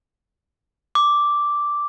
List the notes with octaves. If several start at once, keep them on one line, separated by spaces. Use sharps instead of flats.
D6